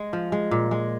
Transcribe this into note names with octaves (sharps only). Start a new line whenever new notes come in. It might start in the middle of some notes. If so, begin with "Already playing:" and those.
Already playing: G#3
F3
G#3
A#2
G#3